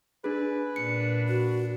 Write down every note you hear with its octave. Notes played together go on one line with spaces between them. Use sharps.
D4 G#4 B4
A#2 D4 C#7
F#4